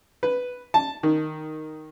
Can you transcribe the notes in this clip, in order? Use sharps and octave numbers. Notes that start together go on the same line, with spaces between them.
B4
A5
D#3